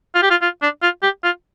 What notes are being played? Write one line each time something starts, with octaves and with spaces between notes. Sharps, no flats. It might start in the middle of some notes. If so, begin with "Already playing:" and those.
F4
G4
F4
F4
D4
F4
G4
F4